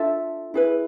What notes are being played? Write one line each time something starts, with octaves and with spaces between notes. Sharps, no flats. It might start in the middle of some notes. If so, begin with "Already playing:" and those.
Already playing: D4 F4 A4 E5
E4 G#4 B4